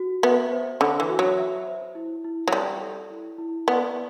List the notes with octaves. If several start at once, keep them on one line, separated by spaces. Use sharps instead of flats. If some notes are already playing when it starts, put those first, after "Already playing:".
Already playing: F#4
B3 E5
C5
D3 B5
E3
F#4
F#3
E5
C5
E4
E4
F#3
G3 D5
A4
E4
E4
B3 D5